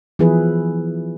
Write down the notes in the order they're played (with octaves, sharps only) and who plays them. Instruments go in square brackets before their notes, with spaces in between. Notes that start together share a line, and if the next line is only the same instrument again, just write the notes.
[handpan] E3 F3 B3 E4 G#4 B4